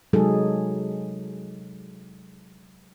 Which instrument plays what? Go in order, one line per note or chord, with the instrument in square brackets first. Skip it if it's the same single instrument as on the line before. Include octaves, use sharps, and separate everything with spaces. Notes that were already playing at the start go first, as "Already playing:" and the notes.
[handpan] C3 F#3 G#3 D#4 G#4 A4